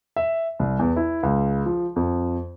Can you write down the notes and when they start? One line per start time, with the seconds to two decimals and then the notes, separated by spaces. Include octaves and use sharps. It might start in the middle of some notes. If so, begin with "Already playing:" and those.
0.16 E5
0.60 C2
0.79 E2
0.96 E4
1.23 C#2
1.66 F3
1.96 F2